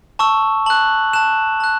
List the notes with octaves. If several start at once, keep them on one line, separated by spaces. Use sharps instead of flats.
A5 C#6 E6
A5 F#6 F#7
A5 F#6 E7
A5 F#6